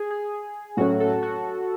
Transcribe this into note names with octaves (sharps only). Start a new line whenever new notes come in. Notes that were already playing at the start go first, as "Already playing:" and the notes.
Already playing: G#4
G#4
A2 F#3 A3 C#4 F#4
A4
F#4